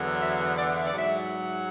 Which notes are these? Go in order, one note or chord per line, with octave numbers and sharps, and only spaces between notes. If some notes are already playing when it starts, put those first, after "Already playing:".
Already playing: E2 D3 F#3
E5
D5
E5
D5
G#2 F#3
E5